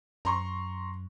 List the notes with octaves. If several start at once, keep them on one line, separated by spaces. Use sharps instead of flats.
F#2 A#5 C6 C#6